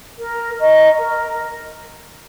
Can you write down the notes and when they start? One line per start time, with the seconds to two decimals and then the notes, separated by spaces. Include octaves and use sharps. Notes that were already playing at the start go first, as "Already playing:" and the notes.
0.19 A#4
0.58 D#5 A#5 C#6
0.98 A#4